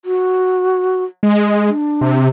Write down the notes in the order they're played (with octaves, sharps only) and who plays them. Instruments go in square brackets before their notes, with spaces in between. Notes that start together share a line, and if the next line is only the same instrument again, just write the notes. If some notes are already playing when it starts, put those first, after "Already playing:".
[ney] F#4
[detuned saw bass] G#3
[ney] D4
[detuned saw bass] C3